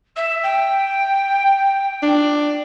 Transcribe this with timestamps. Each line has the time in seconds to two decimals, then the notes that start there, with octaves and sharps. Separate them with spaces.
0.16 E5
0.43 G5
2.03 D4